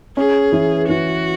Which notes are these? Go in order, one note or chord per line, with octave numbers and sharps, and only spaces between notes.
C#4 G#4
E3
E3 F#4